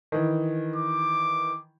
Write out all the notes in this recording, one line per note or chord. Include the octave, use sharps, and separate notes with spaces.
D#3 E3
D6